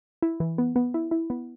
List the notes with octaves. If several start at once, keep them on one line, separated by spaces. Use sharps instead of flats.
E4
E3
B3
B3
E4
E4
B3